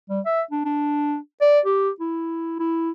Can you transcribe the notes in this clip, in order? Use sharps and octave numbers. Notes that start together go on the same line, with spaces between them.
G3
E5
D4
D4
D5
G4
E4
E4